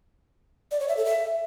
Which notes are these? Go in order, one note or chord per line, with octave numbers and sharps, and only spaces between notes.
D5
C#5
E5
A4
E5